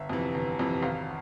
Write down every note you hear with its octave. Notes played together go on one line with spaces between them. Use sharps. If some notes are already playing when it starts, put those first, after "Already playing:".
Already playing: G1 E5
F2 C3 E3
G1
F2 C3 E3
G#1 F5